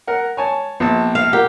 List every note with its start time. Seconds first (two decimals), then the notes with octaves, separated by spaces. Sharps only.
0.07 A#4 F#5
0.37 C#5 G#5 A5
0.80 A#1 B3 A5
1.15 F5
1.33 F4 G4 A#4 F#5